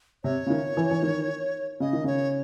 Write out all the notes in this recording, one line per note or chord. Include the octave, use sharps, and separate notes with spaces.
C3 C#5
C#3
D#3
E3
E3
D#3
C#3 D#5
D#3
C#3 C#5